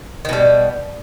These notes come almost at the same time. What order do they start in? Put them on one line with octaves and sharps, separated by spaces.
D#3 B2 G3